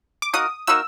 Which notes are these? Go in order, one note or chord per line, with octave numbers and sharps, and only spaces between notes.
D6
A#3 D#4 F#4 A#4 D#6
A#3 D#4 F#4 A#4 E6